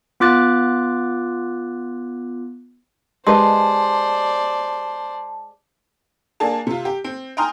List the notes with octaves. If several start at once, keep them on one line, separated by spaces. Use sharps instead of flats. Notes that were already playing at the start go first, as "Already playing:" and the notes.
B3 F4 D6 F#6 A6
G#3 G4 B4 C5 D5 D#5 A5 C6
A#3 D4 G#4 A5
C3 F4
G4
C4
G5 G#5 A#5 C6 D#6 F6